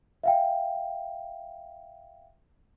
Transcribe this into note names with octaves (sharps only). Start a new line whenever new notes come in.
E5 F5 G5